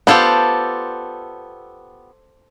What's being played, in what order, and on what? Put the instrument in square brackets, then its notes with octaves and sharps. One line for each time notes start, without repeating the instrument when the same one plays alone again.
[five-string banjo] B3 F4 G4 [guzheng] A4 C5 D5